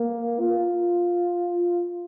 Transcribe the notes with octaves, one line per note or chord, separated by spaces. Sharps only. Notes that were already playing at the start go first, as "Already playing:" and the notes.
Already playing: A#3
F4